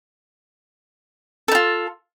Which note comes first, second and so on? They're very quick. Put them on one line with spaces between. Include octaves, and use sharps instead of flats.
A4 D#4 F4